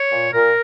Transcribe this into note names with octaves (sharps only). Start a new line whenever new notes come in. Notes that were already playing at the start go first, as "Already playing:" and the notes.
Already playing: C#5
A#2
A#2 A#4